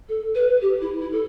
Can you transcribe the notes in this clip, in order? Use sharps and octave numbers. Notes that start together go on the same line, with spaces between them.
A4
B4
G4
E4
E4
A4